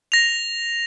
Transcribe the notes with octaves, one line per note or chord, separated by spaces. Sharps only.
A#6 F7